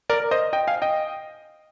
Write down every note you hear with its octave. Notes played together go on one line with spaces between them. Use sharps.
A#4 D5
C5 D#5
D#5 G5
F5 G#5
D#5 G5